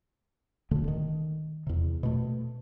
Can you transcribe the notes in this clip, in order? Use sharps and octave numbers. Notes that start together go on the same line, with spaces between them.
D#1 D2 D3 A3
D#3
E2 C3
B2 A3